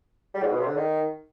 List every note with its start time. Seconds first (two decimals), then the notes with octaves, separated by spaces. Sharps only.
0.34 G3
0.43 G#2
0.52 B2
0.60 C3
0.67 D3
0.76 D#3